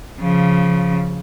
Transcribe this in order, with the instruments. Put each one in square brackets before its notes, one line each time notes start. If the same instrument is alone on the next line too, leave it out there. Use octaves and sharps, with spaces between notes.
[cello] C#3 F3